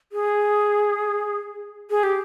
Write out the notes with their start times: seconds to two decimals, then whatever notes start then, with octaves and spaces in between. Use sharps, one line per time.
0.12 G#4
1.90 G#4
2.03 G4